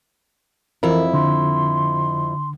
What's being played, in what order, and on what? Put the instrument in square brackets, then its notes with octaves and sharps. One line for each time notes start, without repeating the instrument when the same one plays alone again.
[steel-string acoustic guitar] F2 E4 [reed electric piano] E3 A#4
[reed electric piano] D3 [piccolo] C6